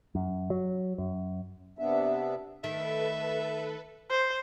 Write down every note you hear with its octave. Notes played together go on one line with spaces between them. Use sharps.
F#2
F#3
F#2
C3 B3 D4 E5
D#3 A3 A4 B4 E5
C5